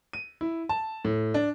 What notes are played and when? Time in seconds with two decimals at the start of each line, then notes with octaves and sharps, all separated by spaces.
0.13 D#7
0.41 E4
0.69 A5
1.05 A2
1.34 D4